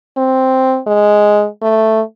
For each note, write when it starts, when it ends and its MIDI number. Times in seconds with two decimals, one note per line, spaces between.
0.17 0.79 60
0.87 1.46 56
1.62 2.01 57